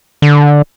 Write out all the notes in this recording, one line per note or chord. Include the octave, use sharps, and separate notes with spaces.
D3